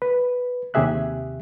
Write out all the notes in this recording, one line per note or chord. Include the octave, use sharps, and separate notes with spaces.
B4
D#2 C3 G4 G#4 E5 F#6